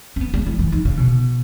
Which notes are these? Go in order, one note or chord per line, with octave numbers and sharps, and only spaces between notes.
C#4
B3
G#3
E3
E3
D#3
C#3
B2